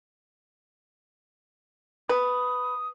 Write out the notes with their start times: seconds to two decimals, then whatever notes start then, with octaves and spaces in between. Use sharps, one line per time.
2.09 B4 D#6